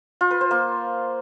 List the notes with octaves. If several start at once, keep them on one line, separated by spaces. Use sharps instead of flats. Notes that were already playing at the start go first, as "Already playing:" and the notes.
F4
B4
C5
A#3